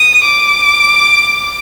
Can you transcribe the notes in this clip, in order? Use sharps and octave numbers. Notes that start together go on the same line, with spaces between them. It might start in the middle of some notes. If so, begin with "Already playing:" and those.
Already playing: D#6
D6